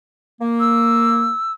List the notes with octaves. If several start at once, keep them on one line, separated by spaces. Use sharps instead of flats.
A#3
E6